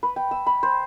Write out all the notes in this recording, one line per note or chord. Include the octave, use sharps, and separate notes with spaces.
B4
G5
E6
B5
C5